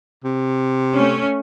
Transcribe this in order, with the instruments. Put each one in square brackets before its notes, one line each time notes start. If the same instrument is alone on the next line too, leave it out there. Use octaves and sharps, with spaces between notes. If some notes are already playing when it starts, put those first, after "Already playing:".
[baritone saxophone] C3
[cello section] A3 C#4